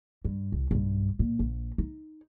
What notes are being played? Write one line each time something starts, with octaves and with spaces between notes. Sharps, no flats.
G2
C2
B1 G2
A#2
A#1
D#4